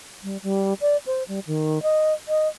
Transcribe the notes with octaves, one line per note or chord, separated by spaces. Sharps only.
G3
G3
D5
C5
G3
D#3
D#5
D#5